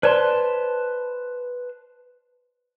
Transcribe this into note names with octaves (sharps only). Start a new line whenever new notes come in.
B4 C5 D5 A5 C6